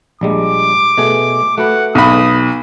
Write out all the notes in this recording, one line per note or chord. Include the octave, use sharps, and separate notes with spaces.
A#1 G3 G#3 D6
B2 A3 G#4
A3 F#4 B4 F#5
B1 B5 D#6